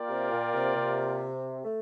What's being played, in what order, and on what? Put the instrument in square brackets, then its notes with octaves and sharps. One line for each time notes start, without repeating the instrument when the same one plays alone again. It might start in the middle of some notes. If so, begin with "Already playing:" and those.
Already playing: [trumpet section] A#3 F4 A#4 D5 G5
[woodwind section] C3
A#2
C3
C3
A3